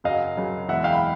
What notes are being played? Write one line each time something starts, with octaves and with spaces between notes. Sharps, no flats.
F#2 C#3 F#3 D#5 F5
F#2 C#3 F#3
E2 B2 G#3 E5 F#5
F5 G5
B5